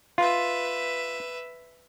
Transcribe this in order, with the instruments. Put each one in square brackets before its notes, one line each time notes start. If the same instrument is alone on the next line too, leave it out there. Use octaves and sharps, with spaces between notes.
[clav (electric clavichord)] F4 [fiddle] B4 E5